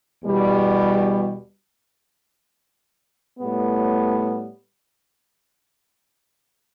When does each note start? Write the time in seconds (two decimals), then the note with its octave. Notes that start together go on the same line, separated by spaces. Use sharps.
0.24 E2 B2 G3
3.38 A2 G3 B3